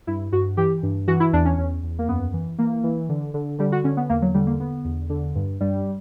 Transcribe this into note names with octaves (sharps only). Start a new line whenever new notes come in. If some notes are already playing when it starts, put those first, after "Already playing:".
G2 E4
G2 F#4
E3 G4
G2
E3 F#4
E4
E2 D4
C#4
E2
E2
A#3
F#2 B3
E3
E3 A#3
E3
D3
D3
D3 G3
F#4
D3 C#4
B3
E2 A#3
F#3
D3 G3
A#3
D3 B3
E2
D3
G2
G2 G3